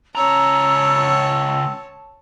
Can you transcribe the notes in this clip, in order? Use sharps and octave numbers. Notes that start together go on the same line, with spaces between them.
C#2 C#4 C#5 A5 A#5 E6